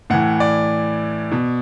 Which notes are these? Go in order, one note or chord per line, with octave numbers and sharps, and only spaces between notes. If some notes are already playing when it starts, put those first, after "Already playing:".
A2 E3 F#5
D5
B2